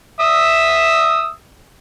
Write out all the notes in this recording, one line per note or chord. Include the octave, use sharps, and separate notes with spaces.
E5 D#6 E6